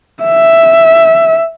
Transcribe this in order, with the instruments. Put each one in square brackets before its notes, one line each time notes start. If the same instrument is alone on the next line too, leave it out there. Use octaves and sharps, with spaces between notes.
[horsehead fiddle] E5